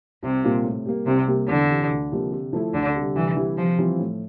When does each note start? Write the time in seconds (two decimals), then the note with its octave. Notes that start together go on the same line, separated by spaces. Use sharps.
0.23 C2 C3
0.44 A#2 G3 A#3 F4
0.64 A2
0.86 G3 A#3
1.06 C2 C3
1.28 C3 G3 A#3
1.48 E2 D3
1.70 C3 E3
1.90 D2
2.12 C3 F3 A#3
2.32 C3
2.53 F3 A3 E4
2.74 D2 D3
2.96 C3 G3
3.16 C2 E3
3.37 C3 E3 G3
3.58 C3 F3
3.79 E3 G3 C4 F4
4.00 A2